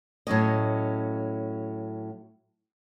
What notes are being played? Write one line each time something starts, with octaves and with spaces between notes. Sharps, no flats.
A2 F#3 C#4 D#5